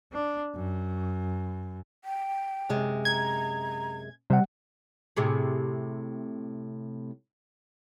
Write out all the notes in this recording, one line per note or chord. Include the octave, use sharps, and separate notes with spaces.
D4
F#2
G5
F#2 C3 G#3
A#5 G#6
C3 G3 F#5
A2 C3 G#4